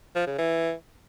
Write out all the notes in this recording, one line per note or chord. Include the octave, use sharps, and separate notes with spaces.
F3
C#3
E3